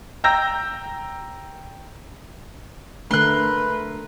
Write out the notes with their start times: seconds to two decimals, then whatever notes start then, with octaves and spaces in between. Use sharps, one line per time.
0.24 G5 A#5 E6 G6 A#6
3.11 D3 A3 D4 A#4 B4 C6 F#6